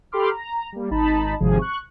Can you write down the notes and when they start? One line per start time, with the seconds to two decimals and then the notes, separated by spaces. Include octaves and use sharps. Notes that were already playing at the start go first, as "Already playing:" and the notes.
0.12 G4 A4 B5 C6 D6 F6
0.31 A#5
0.72 G3 A#3
0.91 G#1 D#4 A5 B5
1.40 G#1 C3 F3 G#4
1.59 C#6 F#6